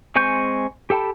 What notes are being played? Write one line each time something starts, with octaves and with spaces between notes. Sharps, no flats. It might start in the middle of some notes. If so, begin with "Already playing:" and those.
G#3 C4 G#5 C#6 G6
G4 A4 G5 A5 B5